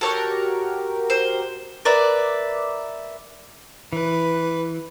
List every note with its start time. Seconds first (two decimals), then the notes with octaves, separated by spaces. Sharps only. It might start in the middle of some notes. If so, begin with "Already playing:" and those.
0.01 F#4 G4 A4 A#4 C#5
1.10 C5
1.85 A#4 B4 D5 E5
3.93 E3 B4